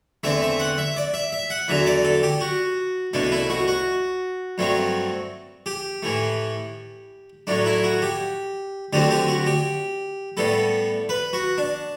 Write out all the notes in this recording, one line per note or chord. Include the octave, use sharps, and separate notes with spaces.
E2 D3 A3 C4 E5
E5
F#5
E5
D5
E5
E5
F#5
E2 D3 F#3 E5
D5
A4
G4
F#4
C2 B2 A3 D4
E4
F#4
F#4
G2 F#3 A3 C4
G4
A2 E3 A3
A2 F#3 A3 D4
E4
F#4
G4
D2 D3 F#3 C4 G4
G4
F#4
G4
A2 G3 B3 A4
B4
F#4
D4